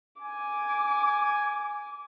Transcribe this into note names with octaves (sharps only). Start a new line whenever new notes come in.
G#5 D6